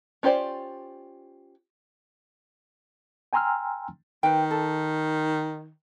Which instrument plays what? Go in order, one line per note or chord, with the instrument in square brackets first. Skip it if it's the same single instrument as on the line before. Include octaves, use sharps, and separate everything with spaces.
[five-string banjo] C#4 F4 G4 C5 D5
[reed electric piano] G5 G#5 A#5 C6 E6 F6
[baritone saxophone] D#3 [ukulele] B4 G5
[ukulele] A4